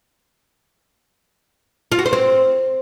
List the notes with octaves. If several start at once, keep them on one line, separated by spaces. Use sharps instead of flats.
F4
F#4
C5
C4